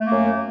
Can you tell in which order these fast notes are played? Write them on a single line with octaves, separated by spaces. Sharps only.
A3 A#3 F#2